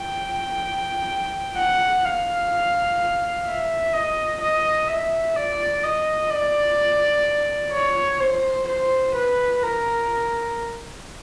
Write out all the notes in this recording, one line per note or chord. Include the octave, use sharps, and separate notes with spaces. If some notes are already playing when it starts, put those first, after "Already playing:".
Already playing: G5
F#5
F5
E5
D#5
D#5
E5
D5
D#5
D5
C#5
C5
C5
B4
A#4